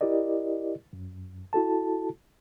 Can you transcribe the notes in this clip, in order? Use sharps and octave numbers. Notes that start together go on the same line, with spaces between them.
E4 G4 A#4 D5 D#5
F#2
E4 F#4 A4 A5